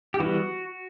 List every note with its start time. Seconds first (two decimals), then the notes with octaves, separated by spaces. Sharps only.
0.14 G4
0.20 E3 G3 B3 F#4